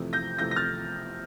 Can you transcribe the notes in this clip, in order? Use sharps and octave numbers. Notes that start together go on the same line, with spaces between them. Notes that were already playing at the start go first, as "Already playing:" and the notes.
Already playing: F2 C3 E3 A3 E4
G6 A#6
F2 C3 E3 A3 E4 G6 A#6
A#6
F6 A6